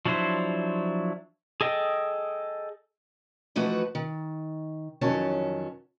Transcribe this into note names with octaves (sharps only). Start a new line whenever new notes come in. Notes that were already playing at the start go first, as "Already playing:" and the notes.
F3 F#3 D4 E4 C5
G#4 A4 D#5 G5
E3 F3 A3 D#4 F#4 B4
D#3
F2 D#3 E3 F#3 C#4 A5